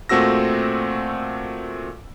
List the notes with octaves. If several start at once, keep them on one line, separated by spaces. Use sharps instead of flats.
A#2 A3 C4 F#4 E6 A#6